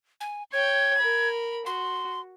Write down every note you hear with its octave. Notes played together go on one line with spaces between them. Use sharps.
G#5
C#5 G5 G#6
A#4 B5
F#4 C6